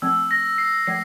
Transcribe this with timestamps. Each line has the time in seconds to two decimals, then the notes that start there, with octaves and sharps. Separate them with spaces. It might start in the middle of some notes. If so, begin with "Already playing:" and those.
0.02 F3 A3 C4 E6
0.31 A#6
0.58 C7
0.87 F3 A3 C7